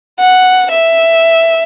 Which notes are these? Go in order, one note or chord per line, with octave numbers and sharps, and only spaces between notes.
F#5
E5